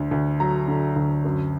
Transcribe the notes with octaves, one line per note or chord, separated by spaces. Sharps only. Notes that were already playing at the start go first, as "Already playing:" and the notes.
Already playing: D2 D3
D2
F#3 A#5
D3
D2
F#2